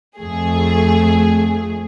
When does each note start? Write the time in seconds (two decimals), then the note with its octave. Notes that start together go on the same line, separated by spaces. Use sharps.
0.17 F2 A3 G#4